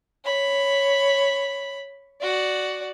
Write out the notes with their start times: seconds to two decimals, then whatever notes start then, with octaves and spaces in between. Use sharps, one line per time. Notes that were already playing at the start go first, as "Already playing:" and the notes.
0.24 C#5 B5
2.21 F#4 D5